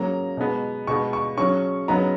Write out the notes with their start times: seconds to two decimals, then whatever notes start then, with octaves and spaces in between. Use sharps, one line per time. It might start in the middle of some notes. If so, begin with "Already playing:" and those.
Already playing: C#3 F#3 A#3 A#5
0.37 B2 G#3 B3
0.87 B2 G#3 B3 C#6
1.13 C#6
1.37 C#3 F#3 C#4 C#6
1.88 C#3 F#3 B3 D#4 A#5